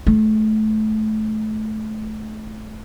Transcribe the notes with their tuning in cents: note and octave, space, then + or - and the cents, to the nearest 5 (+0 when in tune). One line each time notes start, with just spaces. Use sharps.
A3 -25